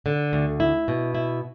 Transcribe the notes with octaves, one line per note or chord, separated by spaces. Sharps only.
D3
D2
E4
B2
E4